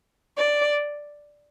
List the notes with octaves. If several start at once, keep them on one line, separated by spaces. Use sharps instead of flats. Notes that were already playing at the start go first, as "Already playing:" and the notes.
D5